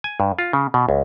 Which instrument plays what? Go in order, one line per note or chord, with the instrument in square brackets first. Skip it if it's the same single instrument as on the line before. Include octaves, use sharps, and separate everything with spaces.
[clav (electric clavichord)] G#5
G2
F4
C#3
B2
C#2